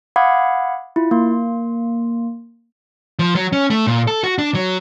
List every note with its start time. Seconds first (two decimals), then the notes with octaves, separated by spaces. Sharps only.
0.16 F5 F#5 B5 D6 D#6 G#6
0.96 E4 F4
1.11 A#3 C6
3.19 F3
3.35 F#3
3.53 C#4
3.70 A3
3.87 A#2
4.07 A4
4.23 F#4
4.38 D4
4.55 F#3